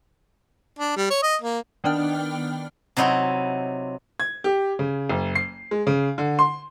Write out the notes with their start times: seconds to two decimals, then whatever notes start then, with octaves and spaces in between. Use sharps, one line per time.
0.79 D4
0.97 G3
1.10 C#5
1.23 D#5
1.42 A#3
1.84 D#3 B3 D4 D5 G5 F6
2.97 C3 F#3 D#4 E4 F#4
4.20 G#6
4.44 G4
4.79 C#3
5.10 F#1
5.35 C7
5.71 G#3
5.87 C#3
6.18 D3
6.39 C6